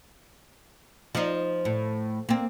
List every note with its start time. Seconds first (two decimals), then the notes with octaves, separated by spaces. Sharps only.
1.15 F3 D#4
1.65 A2
2.29 A#3 C4